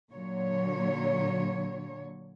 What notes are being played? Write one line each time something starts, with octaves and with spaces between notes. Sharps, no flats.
A#2 D3 F#3 C#5